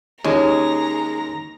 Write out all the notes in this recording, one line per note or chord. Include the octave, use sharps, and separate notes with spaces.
D#2 G#3 C#4 D#5 A#5